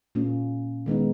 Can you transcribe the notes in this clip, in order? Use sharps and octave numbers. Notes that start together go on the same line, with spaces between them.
A#2 A#3 C#4
D#3 G#3 B3 D#4